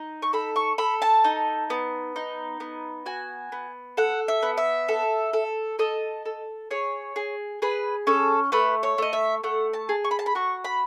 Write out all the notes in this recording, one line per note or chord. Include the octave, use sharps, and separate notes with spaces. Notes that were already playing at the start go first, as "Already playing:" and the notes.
Already playing: D#4
C#6
A4 B5
C#6
A4 B5
A5
D#4
B3
D#4
B3
F#4 G#5
B3
A4 F#5
E5
B3
E5
A4
A4
A4 D#5
A4
G#4 C#5
G#4
G#4 B4
C#4 A4
A3 B4
C#5
A3 D#5
E5
A3 F#5
A5
G#4
C#6
B5
A5
B5
F#4 C#6
B5